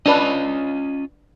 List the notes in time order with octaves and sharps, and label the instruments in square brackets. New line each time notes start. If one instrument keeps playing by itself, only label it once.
[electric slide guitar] C#4 F4 D#5 [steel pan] D4 B4